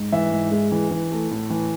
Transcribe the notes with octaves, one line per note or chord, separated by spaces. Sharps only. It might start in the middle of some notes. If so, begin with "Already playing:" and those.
Already playing: G#2
E3 E5
G#2
G#3
E3
E3
A3
A2
E3